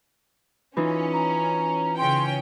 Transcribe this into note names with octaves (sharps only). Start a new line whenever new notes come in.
E3 C#4 D#4 F4
A#5
C#3 C#4 G5 C6